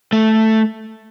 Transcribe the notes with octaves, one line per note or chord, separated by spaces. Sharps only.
A3